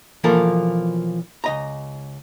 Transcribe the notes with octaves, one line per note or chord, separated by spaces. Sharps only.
B1 E3 F3 A#3 A4 A#4
C#2 D#5 A#5